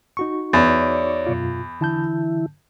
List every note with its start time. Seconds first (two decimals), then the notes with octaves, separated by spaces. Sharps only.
0.17 D#4 F#4 C#6
0.53 E2 C#5 D5
1.27 F#2 B2 F4
1.81 D3 E3 E4 A5 G6